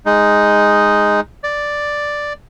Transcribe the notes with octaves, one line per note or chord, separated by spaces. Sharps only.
G#3 D#4
D5